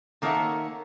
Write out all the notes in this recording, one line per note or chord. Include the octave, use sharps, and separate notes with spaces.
D#3 A#3 A4 C#5 E5 F#5